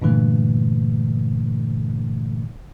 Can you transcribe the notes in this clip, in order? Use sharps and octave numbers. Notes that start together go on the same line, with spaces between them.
G2 A#2 D3 E3 A3